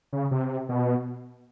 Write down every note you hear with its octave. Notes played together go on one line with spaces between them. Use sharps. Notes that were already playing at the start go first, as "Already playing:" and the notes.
C#3
C3
B2